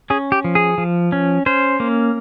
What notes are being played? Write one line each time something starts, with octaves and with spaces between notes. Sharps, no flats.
C#4 G#4
G4
F3
G#4
F3
C#4
C#4 C5
A#3